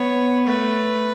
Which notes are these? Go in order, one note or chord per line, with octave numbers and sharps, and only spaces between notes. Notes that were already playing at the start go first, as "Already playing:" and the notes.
Already playing: B3 C#5
A3 B4